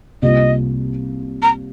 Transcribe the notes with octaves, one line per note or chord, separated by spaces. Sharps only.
C2 C3 G3 A#3 F4 D#5
A#5